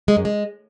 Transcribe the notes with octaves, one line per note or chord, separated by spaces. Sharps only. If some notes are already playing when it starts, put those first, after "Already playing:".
G#3
F#2
G#3